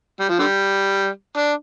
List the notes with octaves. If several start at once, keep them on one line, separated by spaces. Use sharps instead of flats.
G3
F3
D3 G3
D4